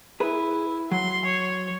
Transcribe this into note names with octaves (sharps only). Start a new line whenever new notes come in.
E4 G#4 B4
F#3 C6
C#5